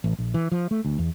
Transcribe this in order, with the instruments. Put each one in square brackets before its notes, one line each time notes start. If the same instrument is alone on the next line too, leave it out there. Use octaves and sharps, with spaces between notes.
[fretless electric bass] A1
A#1
E3
F3
A3
D2
E2